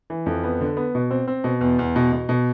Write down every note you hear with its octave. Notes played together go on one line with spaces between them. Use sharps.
E3
F2
B3
D3
B3
B2
C4
C4
B2
E2
E2
B2
B2
B2